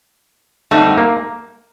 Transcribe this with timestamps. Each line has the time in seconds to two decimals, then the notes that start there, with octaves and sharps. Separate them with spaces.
0.71 F#2 D3 G3 A3 C4 D#4
0.98 A#3